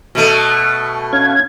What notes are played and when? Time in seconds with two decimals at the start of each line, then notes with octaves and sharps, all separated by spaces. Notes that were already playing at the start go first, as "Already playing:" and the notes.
0.15 B2 A3
1.13 C#4 F5 G#6